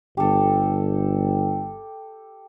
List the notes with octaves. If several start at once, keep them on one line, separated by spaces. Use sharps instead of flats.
G1 G4 A4